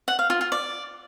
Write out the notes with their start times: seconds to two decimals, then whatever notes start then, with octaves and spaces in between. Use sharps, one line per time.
0.08 F#5
0.19 F5
0.30 F4
0.41 F4
0.52 D5